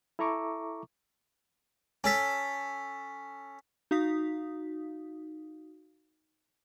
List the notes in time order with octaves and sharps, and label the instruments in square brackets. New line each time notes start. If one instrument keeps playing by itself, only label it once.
[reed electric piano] E4 A4 E5 A#5 C#6 D6
[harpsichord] C#4 A4 [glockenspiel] G#5 B6
[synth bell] D#4 F#4 F5 D#6 B6